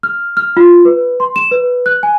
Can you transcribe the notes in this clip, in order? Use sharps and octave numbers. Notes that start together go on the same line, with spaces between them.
F6
F6
F4
B4
C6
E7
B4
F#6
G#5